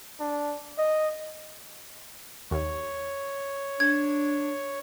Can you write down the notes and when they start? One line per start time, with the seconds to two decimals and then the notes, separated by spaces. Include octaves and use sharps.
0.20 D4
0.78 D#5
2.51 D#2 C#5
3.80 D4 G#6